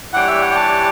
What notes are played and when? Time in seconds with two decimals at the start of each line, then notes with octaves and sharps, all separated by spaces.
0.13 E3 G3 D4 G4 C#5 F#5
0.28 E5
0.41 F#5
0.51 G5
0.55 A5